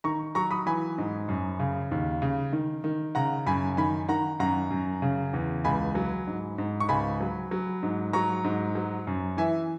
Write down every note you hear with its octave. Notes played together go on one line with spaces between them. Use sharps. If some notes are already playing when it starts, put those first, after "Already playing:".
D#3 A#5 C#6
F#3 A#5 C#6
B5 D#6
E3 G#5 B5
G#2
F#2
C#3
D#2
C#3
D#3
D#3
C#3 F#5 A#5
F#2 G#5 B5
D#3 G#5 B5
D#3 F#5 A#5
F#2 F#5 A#5
F#2
C#3
E2
C#2 G#5 B5
F#3
G#2
G#2
C#6
C#2 G#5 B5
F#3
F#3
G#2
F#3 A#5 C#6
G#2
F#3
F#2
E3 E5 G#5